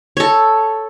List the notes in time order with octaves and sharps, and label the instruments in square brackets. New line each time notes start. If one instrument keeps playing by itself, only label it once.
[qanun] A4 C#5